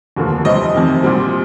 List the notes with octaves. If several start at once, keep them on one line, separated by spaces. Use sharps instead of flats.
F1 D#2 D3 F3 A#3
F1 F2 C3 G3 C4 D#5
F2 C3 D#3
A#1 A#2 G3 C4